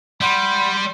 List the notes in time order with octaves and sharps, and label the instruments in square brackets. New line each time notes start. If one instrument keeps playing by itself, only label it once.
[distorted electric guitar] G3 [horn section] F#5 B5 [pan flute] C6